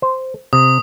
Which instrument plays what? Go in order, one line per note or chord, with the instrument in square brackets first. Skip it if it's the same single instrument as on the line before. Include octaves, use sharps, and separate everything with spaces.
[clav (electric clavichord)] C5
[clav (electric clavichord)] C3 [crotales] D#6